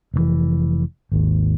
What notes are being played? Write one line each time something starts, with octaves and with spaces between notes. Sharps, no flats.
F1 A#2 E3
G#1 D#2